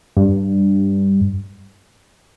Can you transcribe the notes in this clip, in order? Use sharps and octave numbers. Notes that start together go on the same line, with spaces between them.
G2